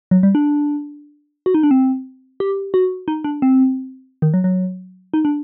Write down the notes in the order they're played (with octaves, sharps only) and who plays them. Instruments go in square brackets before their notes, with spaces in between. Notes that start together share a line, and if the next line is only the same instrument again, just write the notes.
[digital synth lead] F#3
G3
D4
F#4
D#4
D4
C4
G4
F#4
D#4
D4
C4
D#3
F#3
F#3
D#4
D4